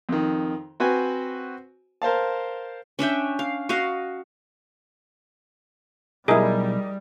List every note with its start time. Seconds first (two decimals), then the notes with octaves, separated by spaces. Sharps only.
0.09 F2 D#3
0.80 C4 F#4 B4 C5 G#5
2.02 A#4 C5 F5 A5
2.99 C#4 D4 E5 G5
3.39 F5
3.69 F#4 D#5 F5
6.28 B1 G3 E4 G#4 A#4 D#5